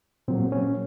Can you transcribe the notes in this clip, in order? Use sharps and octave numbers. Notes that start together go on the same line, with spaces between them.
A#2 F#3 A#3 C4
C#4